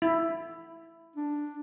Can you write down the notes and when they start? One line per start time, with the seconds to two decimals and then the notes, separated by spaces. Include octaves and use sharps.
0.02 E4
1.16 D4